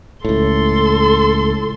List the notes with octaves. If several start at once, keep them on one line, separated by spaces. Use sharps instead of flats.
C#2 A2 A4 C6